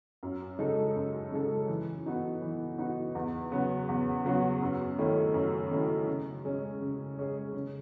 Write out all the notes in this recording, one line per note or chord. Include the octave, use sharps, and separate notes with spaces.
F#2
C#3 G#3 D#4 A4
F#2
C#3 G#3 D#4 A4
E3
B3 D#4 F#4
E3
B3 D#4 F#4
E2
C#3 F#3 B3 F#4
E2
C#3 F#3 B3 F#4
F#2
D#3 A3 C#4 E4
F#2
D#3 A3 C#4 E4
C#3
G#3 C#4 G#4
C#3
G#3 C#4 G#4
C#3